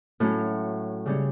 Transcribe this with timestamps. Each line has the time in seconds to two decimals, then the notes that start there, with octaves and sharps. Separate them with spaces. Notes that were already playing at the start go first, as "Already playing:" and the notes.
0.20 A2 F#3 C#4
1.06 C#3 G3 C#4